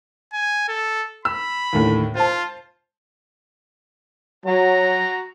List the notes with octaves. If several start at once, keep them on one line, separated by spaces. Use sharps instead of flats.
G#5
A4
B5 E6
D#2 A2 D3
F4 C5 A5
F#3 F#4 A#5